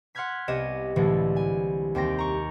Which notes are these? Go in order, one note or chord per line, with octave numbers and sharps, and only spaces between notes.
F#5 C6 F6 F#6 G#6 B6
C2 B3 G4 C#5 D#5 E7
C2 A2 D3 E3 G#3 A3
G#5
D#2 C4 G5 A#6
A#5 C#6